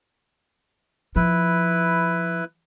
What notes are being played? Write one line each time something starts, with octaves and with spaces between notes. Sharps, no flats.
F3 E4 B4